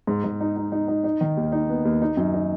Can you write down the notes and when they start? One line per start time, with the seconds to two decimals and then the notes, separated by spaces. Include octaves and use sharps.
0.07 G#2
0.24 G#2
0.41 D#4
0.57 D#4
0.72 D#4
0.88 D#4
1.04 D#4
1.21 D#3
1.37 D#2
1.52 D#4
1.69 B3
1.85 D#2
2.02 D#4
2.17 F#2
2.34 D#4